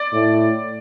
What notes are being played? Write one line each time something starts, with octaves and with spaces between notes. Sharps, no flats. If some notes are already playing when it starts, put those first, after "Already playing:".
Already playing: D5
A2